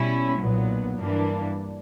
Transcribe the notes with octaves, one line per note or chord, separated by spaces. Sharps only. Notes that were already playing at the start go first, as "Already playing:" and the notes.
Already playing: B2 G3 C#4 E4
B1 A#2 F#3 B3
G2 E3 A#3 D4